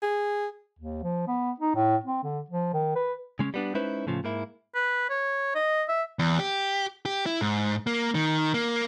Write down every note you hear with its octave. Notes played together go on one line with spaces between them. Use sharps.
G#4
D#2
F3
B3
D#4
A2
C4
D3
F3
D#3
B4
C#3 G#3 C#4
G3 B3 D4
G#3 C#4 D#4 E4 B4 C5
A2 C#3 F3
G#2 A#3 E4
B4
C#5
D#5
E5
E2
G4
G4
E4
G#2
A#3
D#3
A#3